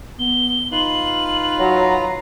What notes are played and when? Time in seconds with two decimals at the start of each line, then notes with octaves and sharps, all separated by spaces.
0.19 B3 G7
0.72 D#4 F4 B4 F5 F#7
1.58 F#3 A#5